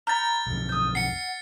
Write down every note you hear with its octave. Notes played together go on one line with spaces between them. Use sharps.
A#5 B5 F6 G6 A6
B1 F2
D#6 G6
F#5 C7 C#7